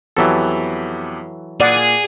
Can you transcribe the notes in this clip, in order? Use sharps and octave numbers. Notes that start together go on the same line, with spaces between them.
F2 E3 F#3 B3 G4 A4
A#2 G#4 D5 F#5 D#7